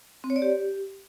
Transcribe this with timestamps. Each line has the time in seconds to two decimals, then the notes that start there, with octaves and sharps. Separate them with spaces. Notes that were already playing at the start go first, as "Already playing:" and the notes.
0.24 C4
0.30 C#5
0.36 D5
0.42 G4